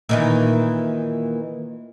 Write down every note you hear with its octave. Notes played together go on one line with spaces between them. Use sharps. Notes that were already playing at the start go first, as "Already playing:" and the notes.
A#2 D#3 E3